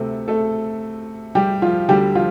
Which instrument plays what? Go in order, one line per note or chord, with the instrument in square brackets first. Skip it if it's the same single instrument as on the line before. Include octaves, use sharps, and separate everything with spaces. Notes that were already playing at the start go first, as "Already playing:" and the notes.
Already playing: [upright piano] D2 C3 A3 A4
A3 A4
G3 G4
F3 F4
D2 D3 G3 G4
F3 F4